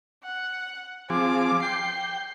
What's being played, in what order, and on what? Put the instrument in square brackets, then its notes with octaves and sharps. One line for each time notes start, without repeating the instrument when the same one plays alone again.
[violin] F#5
[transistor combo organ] F3 C4 G#4 [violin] D6
[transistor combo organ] G5 [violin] C7